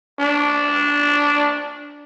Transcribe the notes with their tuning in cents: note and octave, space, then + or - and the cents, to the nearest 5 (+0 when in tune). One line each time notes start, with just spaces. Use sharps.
D4 -10